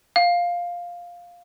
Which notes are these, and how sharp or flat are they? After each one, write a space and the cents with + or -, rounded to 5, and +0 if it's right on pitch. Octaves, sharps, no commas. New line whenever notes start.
F5 +5